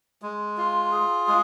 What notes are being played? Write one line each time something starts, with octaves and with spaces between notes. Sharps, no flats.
G#3
F4
G#4
G#3